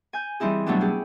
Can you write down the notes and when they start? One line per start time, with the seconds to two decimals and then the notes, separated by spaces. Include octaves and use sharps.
0.13 G#5 G6
0.40 E3 G3 C4 D#4 E4 G#4
0.66 B2 F#3 G3 A3 B3 D4
0.81 C#4 G4 G#4